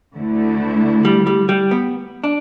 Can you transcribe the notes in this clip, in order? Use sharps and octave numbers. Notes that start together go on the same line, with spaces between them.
D2 D3 A3 E4
G3
G3
G3
B3
D4